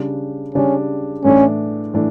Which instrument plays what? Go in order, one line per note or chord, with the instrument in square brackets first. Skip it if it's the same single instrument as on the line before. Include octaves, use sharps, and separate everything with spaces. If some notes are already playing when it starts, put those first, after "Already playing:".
Already playing: [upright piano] C#3 G3 D4
[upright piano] C#3 G3 D4 [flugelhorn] C#4
[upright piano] A2 E3 A3 D4 [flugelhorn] C#4
[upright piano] A2 E3 A3 D4